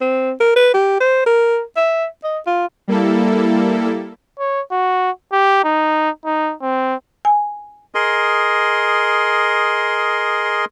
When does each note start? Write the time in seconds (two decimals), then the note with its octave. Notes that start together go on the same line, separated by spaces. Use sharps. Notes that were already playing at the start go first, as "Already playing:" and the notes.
0.01 C4
0.40 A#4
0.56 B4
0.74 G4
1.01 C5
1.26 A#4
1.76 E5
2.24 D#5
2.46 F4
2.88 G3 A#3 E4 A4
4.39 C#5
4.72 F#4
5.32 G4
5.64 D#4
6.25 D#4
6.62 C4
7.25 G#5
7.95 G#4 A#4 D#5 C6